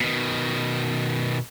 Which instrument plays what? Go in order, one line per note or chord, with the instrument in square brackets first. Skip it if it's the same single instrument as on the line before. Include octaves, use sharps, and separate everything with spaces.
[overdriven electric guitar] B2 D#3